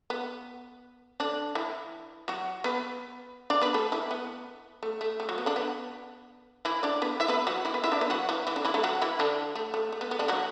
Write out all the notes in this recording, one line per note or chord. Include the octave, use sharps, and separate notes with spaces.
B3
D3 D4
E3 E4
F#3 F#4
B3 B4
D4 D5
B3 B4
A3 A4
E3 E4
B3
A3
A3
A3
F#3
B3
D3 D4
B3
E3 E4
D4 D5
B3 B4
E4 E5
B3 B4
F#3 F#4
E3 E4
B3 B4
E4 E5
D4 D5
B3 B4
F#3 F#4
E3 E4
E3 E4
D3 D4
E3 E4
A3 A4
F#3 F#4
E3 E4
D3 D4
A3
A3
A3
B3
B3
D3 D4
F#3 F#4